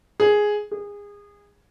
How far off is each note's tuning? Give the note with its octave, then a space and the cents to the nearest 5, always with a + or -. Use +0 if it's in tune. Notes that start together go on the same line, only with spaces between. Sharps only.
G#4 +5
G#4 -25